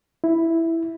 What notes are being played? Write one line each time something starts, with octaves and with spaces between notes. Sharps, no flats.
E4